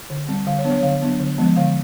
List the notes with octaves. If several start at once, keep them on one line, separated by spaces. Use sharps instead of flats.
D3
G3 C4
D3 F5
C#5
F#3 B3 D4
C#5
D3 F5
F#3 B3 D4
D3
F3 G#3 B3
D3 F5